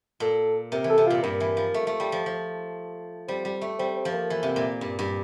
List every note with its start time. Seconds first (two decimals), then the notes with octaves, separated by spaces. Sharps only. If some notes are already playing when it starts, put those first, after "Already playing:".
0.20 A#2 A4
0.72 C3 A#4
0.84 E3
0.90 A4
0.98 C3
1.06 A#2 F4
1.23 G2 A#4
1.40 E3
1.57 F3
1.74 A3
1.87 A3
2.00 G3
2.12 F3
2.26 F3
3.28 G3 C4
3.45 G3
3.61 A3
3.78 G3 C4
3.96 C4
4.05 F3
4.13 A#3
4.30 E3
4.43 C3
4.56 A#2
4.81 G2
4.99 G2